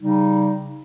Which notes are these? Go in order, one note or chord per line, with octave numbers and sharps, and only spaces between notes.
C#3 G3 D#4